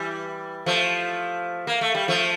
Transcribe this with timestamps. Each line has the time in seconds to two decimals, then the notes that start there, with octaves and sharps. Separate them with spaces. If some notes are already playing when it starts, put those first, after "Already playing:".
Already playing: E3 G3
0.66 F3 A3
1.67 A#3
1.81 A3
1.95 G3
2.08 F3 A3